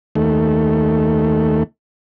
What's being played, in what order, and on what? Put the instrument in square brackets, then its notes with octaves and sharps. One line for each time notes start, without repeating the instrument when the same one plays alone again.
[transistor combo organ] D#2 A3